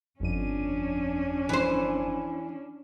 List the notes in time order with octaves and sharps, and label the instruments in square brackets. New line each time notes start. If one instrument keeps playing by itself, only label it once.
[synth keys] G1 F2 D#7 [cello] C#4 D4
[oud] E3 C5